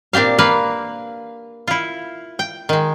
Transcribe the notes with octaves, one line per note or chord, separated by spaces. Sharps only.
A#2 C4 D4 G4 F5
A#3 B4 F5
E4 F4
G5
D#3 G#3